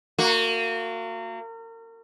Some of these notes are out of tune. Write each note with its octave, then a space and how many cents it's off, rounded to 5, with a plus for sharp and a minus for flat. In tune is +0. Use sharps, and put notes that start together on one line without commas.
A#3 -35 F#4 -20